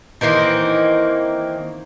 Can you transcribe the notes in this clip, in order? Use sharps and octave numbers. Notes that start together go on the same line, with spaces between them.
D#3 E3 A#3 C4